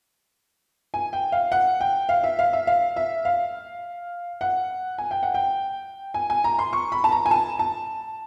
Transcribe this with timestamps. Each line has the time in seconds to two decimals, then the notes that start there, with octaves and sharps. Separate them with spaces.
0.94 G#5
1.13 G5
1.32 F5
1.52 F#5
1.81 G5
2.09 F5
2.23 E5
2.39 F5
2.53 E5
2.67 F5
2.96 E5
3.25 F5
4.41 F#5
4.98 G#5
5.11 G5
5.23 F#5
5.34 G5
6.14 G#5
6.30 G#5
6.44 A#5
6.59 C6
6.73 C#6
6.92 B5
7.04 A5
7.12 A#5
7.26 G#5
7.31 A5
7.59 A5